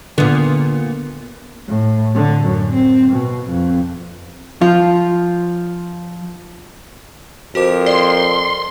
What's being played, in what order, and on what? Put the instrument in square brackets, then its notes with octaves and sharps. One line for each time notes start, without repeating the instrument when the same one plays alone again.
[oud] A#2 B3 [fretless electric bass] D3
[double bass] A2
D3
F#2
C4
B2
F2
[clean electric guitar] F3 [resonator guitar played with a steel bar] F4
[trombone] F2 [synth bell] F#4 C5 D6 [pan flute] A#4
[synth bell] D5 [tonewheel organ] C6